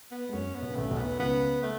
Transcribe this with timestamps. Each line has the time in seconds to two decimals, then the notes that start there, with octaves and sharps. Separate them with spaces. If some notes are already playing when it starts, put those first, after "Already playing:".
0.11 B3
0.29 G#3
0.33 F#2 F#3 C#4
0.55 B3
0.62 B2
0.70 C#3
0.76 B1 B2 A3
0.91 B1 B2
0.98 B3
1.19 C#2 C#3 B3
1.63 A3